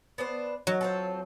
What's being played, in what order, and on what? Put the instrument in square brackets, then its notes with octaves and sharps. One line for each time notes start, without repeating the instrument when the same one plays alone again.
[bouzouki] B3 D4 C5
[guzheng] F#3 [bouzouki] A#4
[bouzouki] C4 F4 A4